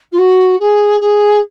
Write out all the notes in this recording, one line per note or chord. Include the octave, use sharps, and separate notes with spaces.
F4
F#4
G#4
G#4